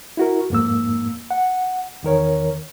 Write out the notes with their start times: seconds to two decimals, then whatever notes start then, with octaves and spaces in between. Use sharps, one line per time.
0.17 E4 F#4 A#4
0.50 F2 G#2 A#3 E6
1.31 F#5
2.03 E2 D#3 A#4 C#5